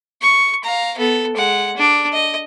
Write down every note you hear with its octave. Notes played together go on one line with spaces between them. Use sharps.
C#6
F5 A#5
B3 A4
G#3 F#5
D4
D#5